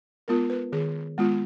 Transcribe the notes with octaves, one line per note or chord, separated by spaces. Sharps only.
G#3 B3 F4 A#4
B4
D#3 G#4
G#3 B3 F4